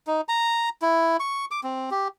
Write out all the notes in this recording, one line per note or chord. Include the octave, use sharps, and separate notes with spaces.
D#4
A#5
E4
C#6
D6
C4
G4